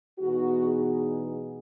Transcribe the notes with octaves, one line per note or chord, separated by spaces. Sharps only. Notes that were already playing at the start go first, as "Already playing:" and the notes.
E2 B2 G#3 B3 D#4 F#4
G#4